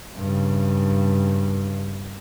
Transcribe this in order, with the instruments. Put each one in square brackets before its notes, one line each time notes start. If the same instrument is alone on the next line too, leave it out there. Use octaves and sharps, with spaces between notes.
[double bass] G2 C#3